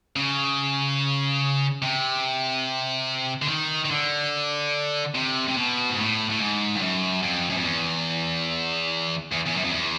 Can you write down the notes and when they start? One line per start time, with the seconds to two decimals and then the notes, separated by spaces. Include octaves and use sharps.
0.16 C#3
1.82 C3
3.42 D3
3.48 D#3
3.84 D#3
3.90 D3
5.15 C3
5.48 C3
5.57 B2
5.90 G#2
5.99 A2
6.30 A2
6.40 G#2
6.76 G2
6.82 F#2
7.22 F2
7.50 F#2
7.57 F2
7.64 E2
9.32 E2
9.46 E2
9.56 F#2
9.64 F2
9.72 E2